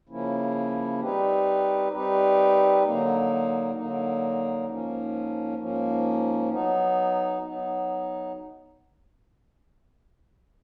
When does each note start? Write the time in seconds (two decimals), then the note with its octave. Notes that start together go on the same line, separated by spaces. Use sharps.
0.09 C#3 F3 A#3 C#4 E4
1.00 G3 C4 D#4 G4 B4
1.92 G3 C4 D#4 G4 B4
2.84 D3 F#3 A#3 D#4
3.75 D3 F#3 A#3 D#4
4.67 G#2 F3 A#3 C#4
5.58 G#2 F3 A#3 C#4
6.50 F#3 B3 D#4
7.41 F#3 B3 D#4